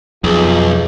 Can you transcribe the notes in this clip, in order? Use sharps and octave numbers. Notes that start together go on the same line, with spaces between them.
B1 F2 F4 G#4